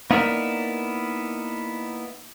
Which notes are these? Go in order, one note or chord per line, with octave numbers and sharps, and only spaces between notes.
A#3 B3 D#4 E4 A#4 D5